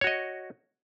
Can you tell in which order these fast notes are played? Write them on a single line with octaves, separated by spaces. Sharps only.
C#5 F#4 D#5